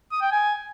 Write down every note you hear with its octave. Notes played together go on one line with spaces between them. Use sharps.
D#6
G5
G#5